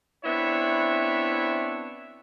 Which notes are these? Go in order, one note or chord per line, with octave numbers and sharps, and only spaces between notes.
B3 C4 D4 E4 C#5 E5